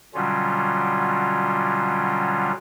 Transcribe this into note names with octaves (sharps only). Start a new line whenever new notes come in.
B2 D3 F#3 G3 C#4 F4